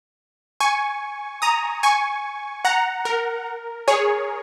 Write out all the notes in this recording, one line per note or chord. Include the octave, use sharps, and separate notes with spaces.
G#5 C#6
A#5 D#6
G#5 C#6
F#5 A#5
A#4
G#4 C#5